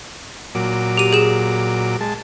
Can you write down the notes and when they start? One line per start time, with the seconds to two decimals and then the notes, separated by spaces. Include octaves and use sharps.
0.55 A#2 F#3 D6
0.97 G4 D#7
1.13 G#4 E7
2.01 G#3 A5